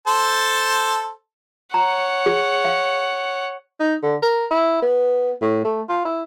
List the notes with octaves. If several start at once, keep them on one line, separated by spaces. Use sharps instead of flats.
A4 C5 A5
C#5 F#5 A#5
G#4
F5
D#4
D3
A#4
E4
B3
A2
A3
F4
E4